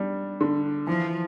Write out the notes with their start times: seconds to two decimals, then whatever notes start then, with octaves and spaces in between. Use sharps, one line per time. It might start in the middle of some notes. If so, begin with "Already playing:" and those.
Already playing: G3 D4
0.41 D3
0.87 E3 F3